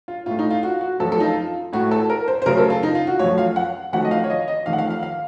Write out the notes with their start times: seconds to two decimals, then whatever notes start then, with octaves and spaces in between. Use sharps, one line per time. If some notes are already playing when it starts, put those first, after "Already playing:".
0.08 F4
0.26 A2 A3 F4
0.39 D#4
0.51 F4
0.63 F#4
0.81 F#4
0.99 F#2 F3 A3 A4
1.12 A4
1.20 D#4
1.24 F4
1.73 A2 A3 F#4
1.91 A4
2.10 A#4
2.28 C5
2.42 C5
2.46 F#2 C#3 F#3 A3 A#4
2.58 A4
2.70 F4
2.83 D#4
2.95 F4
3.07 F#4
3.19 F#2 F3 A3 C#5
3.38 F5
3.56 F#5
3.93 F2 D#3 F#3 A3 F#5
4.05 D#5
4.11 F5
4.24 C#5
4.30 D#5
4.48 D#5
4.66 F2 D#3 A3 F5
4.73 F#5
4.78 F5
4.90 F5
5.03 F5